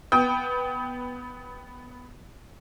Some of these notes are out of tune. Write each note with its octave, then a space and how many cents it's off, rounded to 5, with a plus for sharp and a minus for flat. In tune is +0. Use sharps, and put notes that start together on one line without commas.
B3 +0 G5 +0 D#6 +35